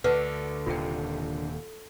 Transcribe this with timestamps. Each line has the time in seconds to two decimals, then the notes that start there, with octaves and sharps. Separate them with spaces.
0.04 D2 D3 B4 F#5 A5
0.66 D#1 D#2 C3 F4 G5